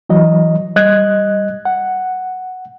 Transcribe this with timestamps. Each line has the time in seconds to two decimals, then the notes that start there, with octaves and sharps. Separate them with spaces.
0.09 E3 F#3 D#5
0.76 G3 D#5 F#6 G#6
1.65 F#5